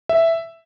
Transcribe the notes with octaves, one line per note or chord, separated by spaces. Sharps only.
E5